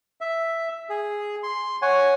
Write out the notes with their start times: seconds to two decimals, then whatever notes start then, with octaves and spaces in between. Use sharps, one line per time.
0.21 E5
0.89 G#4
1.43 C6
1.82 C#5 F#5 G#5